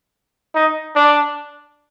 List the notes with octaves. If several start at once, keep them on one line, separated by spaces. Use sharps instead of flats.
D#4
D4